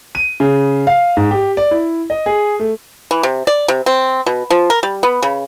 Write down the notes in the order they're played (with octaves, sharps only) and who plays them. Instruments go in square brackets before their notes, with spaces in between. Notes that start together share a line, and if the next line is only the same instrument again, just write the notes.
[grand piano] D#7
C#3
F5
G#2
G4
D5
E4
D#5
G#4
A3
[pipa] E3
C3
D5
C3
C4
B2
F3
A#4
G3
B3
C#3